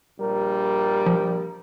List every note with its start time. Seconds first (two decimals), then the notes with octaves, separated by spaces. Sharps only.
0.19 A#1 G3 A#4
1.06 F3